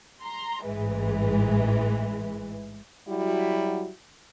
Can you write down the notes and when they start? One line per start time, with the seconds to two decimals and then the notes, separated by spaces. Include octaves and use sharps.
0.22 A#5 C6
0.64 A1 G#2 E3 G#3
3.08 F#3 G3 E4 F#4